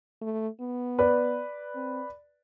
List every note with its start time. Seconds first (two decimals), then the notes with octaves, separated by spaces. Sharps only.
0.22 A3
0.61 B3
0.99 B4 D5
1.75 C4